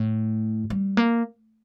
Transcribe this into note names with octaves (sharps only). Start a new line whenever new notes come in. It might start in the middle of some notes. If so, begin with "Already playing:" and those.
Already playing: A2
G3
A#3